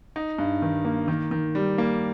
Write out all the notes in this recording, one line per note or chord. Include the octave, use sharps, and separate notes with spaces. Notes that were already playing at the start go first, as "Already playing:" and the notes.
D#4
G2
D#3
A#3
D#3
D#3
G3
A#3